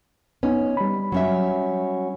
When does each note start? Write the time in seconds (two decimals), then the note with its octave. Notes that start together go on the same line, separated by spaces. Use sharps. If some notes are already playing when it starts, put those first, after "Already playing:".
0.43 B3 C#4 D#4
0.77 G3 B5
1.12 F#3 C#4 E5